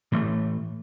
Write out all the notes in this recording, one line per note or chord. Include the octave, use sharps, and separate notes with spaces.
A2 E3 A3